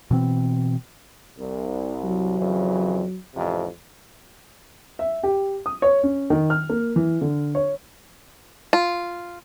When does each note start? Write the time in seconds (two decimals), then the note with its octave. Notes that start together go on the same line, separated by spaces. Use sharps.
0.11 B2 E3 C4
1.39 C2
2.04 F#3
2.39 F2 C#3 E3
3.35 A1 F2 C3
4.99 E5
5.23 G4
5.66 D#6
5.82 C#5
6.03 C#4
6.30 D#3
6.50 F6
6.70 A#3
6.96 E3
7.21 D3
7.55 C#5
8.73 F4